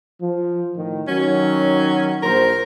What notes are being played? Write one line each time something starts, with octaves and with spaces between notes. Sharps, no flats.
F3
A2 D#3
D#3 F#3 C#4
A#1 A#4 C5